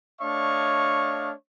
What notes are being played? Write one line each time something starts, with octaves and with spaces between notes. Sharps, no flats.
A3 D4 C#5 D#5 F5 C#6